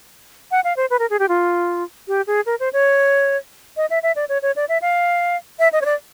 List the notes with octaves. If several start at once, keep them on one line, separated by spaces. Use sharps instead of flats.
F#5
F5
C5
B4
A#4
G#4
G4
F4
G4
G#4
A#4
C5
C#5
D#5
E5
E5
D5
C#5
C#5
D5
E5
F5
E5
D#5
C#5
D5